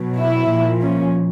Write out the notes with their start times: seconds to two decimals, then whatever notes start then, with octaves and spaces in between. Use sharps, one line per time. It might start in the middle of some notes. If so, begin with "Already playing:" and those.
Already playing: B2 F#3
0.19 E4
0.50 A#2 F3
0.82 C#4